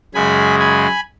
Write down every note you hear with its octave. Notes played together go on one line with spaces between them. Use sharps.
F#2 C#3 G#3 G#5 B5
G#5 B5